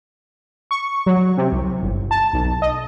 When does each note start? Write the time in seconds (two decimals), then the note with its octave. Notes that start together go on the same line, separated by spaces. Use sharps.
0.71 C#6
1.06 F#3
1.37 C3
1.52 C2
1.82 G1
2.11 A5
2.33 B1
2.62 D#5